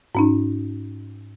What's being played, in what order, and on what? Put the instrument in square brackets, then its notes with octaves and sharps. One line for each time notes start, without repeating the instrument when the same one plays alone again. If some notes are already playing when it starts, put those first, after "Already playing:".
[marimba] G#2 C#4 D#4